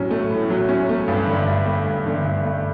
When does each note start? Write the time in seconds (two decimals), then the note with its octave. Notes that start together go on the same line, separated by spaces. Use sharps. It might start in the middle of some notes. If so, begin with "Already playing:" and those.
Already playing: A2 F#3 C#4
0.11 A3
0.30 A2
0.50 F#3
0.69 C#4
0.89 A3
1.08 G2
1.27 D3
1.47 G2
1.66 A3
1.86 G2
2.06 D3
2.25 G2
2.44 A3